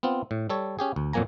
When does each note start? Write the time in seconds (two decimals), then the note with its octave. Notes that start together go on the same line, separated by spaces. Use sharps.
0.03 B3 C4 F4
0.31 A2
0.50 G3 A4 C#5
0.79 C#4 G4 G#4
0.96 D2
1.13 F2 A#2 F#3 A#3 G#5 A#5